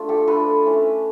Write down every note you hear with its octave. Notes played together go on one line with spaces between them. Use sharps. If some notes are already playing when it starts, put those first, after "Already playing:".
Already playing: A3 D4 F4
G4 A4
A3 D4 F4 A4 B4
A3 C#4 E4